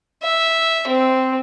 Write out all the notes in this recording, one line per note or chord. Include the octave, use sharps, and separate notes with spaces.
E5
C4